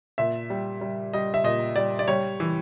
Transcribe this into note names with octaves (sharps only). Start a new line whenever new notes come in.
A#2 E5
G3
G3
G3 D#5
E5
A#2 D#5
G3 D5
D5
G3 C#5
E3